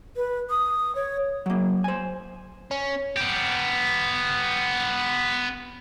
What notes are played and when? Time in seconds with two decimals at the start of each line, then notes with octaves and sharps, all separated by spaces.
0.16 B4
0.50 D#6
0.95 C#5
1.46 F#3 A#3
1.84 C5 G#5
2.71 C#4
3.17 B3 G4